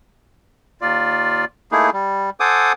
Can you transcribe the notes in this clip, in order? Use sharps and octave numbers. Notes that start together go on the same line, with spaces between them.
D#2 F4 D5
A3 A#3 D#4 E4 G#4
G3
A4 C5 F#5 G#5 D6 D#6